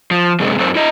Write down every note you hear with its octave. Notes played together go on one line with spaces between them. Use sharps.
F3
F#2 C3 G#3
F#2 A3 C4
E4 D#5